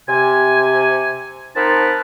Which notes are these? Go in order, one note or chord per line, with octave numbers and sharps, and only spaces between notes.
C3 G#5
F3 C4 D#4 A#4 B4 A5